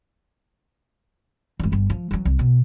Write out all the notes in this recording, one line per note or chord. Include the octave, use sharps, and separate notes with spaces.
G#1 E3
G1 G2
F3
E3 F#3
C2
B2